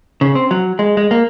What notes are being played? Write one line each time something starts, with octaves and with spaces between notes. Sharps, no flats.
C#3
C4
F#3
G#3
G#3
A#3